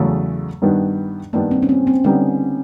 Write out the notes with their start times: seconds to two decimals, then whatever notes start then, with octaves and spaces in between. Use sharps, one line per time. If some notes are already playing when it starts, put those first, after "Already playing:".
Already playing: E2 C#3 F#3 A3
0.62 G2 D#3 G3 B3 D4
1.33 G2 D#3 G3 A#3 B3 D4
1.51 C4
1.62 C#4
1.69 C4
1.87 C4
2.04 D3 G3 B3 C#4 D#4